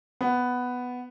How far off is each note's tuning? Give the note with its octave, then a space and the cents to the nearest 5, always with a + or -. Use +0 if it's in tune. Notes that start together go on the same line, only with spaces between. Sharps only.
B3 +5